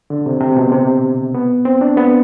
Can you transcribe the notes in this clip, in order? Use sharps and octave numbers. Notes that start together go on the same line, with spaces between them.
D3
C3
C3
B2
C3
B3
C4
D4
B3